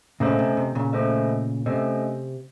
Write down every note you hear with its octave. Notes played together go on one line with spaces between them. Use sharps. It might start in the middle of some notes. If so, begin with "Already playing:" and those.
A#2 C#3 A3 C#4 A4 C5 D#5
C3
C3
A#2 C#3
A3 C#4 A4 C5 D#5
C3 A3 C#4 A4 C5 D#5